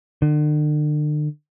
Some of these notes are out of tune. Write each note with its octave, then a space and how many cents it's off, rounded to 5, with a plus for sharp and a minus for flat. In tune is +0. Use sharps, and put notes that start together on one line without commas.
D3 +40